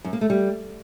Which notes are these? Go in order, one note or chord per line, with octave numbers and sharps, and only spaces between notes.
F#2
A#3
A3
G3